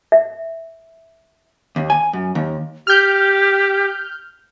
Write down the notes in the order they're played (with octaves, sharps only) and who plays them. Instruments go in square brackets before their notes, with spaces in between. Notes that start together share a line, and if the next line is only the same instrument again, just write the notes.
[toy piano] E5
[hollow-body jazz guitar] D#2
G#5
F#2
D#2
[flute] G4 [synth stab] F6 G6